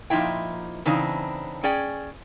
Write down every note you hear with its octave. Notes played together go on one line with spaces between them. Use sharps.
A#2 F3 C4 D#4 E4 G5
C#3 E3 C4 D4 D#4
C#4 G#4 D5 G5